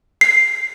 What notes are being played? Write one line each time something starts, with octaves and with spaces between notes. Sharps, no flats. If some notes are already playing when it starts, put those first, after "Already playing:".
C7